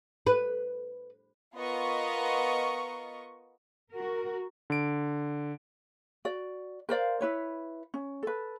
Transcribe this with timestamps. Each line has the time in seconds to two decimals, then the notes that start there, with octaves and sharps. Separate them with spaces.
0.27 B4
1.54 B3 F4 A#4 D#5 C#6
3.91 F#4 A#4
4.70 D3 D7
6.25 F#4 D5
6.89 A#4 C5 D5 F5
7.21 E4 B4 C#5
7.94 C#4
8.23 A4 B4